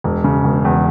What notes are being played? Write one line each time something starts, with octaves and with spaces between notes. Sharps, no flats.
E1
C#3
E1
E2